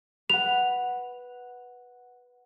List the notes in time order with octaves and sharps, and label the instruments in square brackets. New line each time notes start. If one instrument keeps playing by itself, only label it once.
[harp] B4 F#5 [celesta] F7